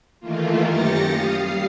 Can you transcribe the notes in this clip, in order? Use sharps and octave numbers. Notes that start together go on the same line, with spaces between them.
D#3 E3 A3 A#3 F4
F#2 G4 A6 A#6 C#7
F5 D#6
G3 F5 C7